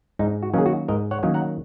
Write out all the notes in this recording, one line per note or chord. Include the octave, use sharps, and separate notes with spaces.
G#2 D#4
F#4
D#3 F#3 A#3 C#4 G#4
F#4
G#2 A#4 D#5
C#5 F#5
D#3 F#3 A#3 C#4
F#5 A#5